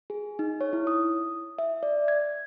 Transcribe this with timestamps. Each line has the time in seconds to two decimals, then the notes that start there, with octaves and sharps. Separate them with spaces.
0.10 G#4
0.39 D#4
0.61 C#5
0.73 E4
0.87 D#6
1.59 E5
1.83 D5
2.08 G#6